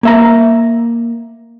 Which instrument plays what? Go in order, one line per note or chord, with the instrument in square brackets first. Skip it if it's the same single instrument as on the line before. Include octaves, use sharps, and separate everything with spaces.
[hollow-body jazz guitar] A#3 E5 A#5